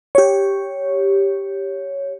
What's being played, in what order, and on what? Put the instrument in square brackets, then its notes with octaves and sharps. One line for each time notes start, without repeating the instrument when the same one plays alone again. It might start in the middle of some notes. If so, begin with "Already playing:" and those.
[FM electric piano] G4 C#5